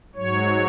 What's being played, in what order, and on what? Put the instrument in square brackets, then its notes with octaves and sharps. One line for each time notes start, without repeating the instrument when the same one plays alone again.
[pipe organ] G#2 F#3 C#5